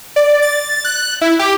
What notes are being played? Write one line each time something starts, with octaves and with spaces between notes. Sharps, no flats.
D5
A6
F#6
E4
G4